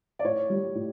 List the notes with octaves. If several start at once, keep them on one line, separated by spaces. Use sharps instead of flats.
D5
A2 C#5
G3
A2